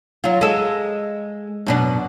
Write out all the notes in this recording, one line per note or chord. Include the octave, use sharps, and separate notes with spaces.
F#3 F4
G#3 A4
F#2 B2 D4